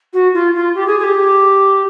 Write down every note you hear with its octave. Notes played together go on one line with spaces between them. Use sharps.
F#4
F4
F4
G4
G#4
G#4
G4